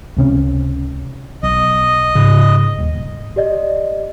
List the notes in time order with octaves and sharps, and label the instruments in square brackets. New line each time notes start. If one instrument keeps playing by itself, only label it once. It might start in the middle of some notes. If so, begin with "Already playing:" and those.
[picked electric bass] C#2 C3 C#4
[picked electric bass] B1 [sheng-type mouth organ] D#5
[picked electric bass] G#2 C#3
D#1
[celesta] G4 D5 D#5